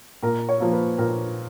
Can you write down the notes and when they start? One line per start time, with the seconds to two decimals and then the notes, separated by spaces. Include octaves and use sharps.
0.23 A#2 A#4
0.49 C#5
0.60 F3 A#3
0.73 B4
0.98 A#2 A#4